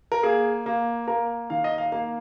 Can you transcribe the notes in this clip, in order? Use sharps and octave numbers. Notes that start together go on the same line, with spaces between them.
A#4
A#3 G#4
A#3
A#3 A#4
D#3 F5
D#5
F5
A#3 F5